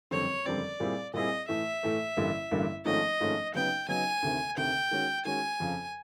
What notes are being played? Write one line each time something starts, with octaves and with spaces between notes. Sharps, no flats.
F#1 F2 D3 G3 C4 C#5
F#1 F2 D3 G3 C4 D5
A#2 G3 C4 E4 G#4
A#2 G3 C4 E4 G#4 D#5
A2 E3 A3 E5
A2 E3 A3
A1 G2 D3 G3 A#3
A1 G2 D3 G3 A#3
G#1 G#2 F3 A3 C#4 D#5
G#1 G#2 F3 A3 C#4
C#3 F#3 B3 D#4 G5
C#3 F#3 B3 D#4 G#5
D2 C3 D#3
D2 C3 D#3 G5
D#3 G#3 C#4 F#4
D#3 G#3 C#4 F#4 G#5
F2 C#3 F3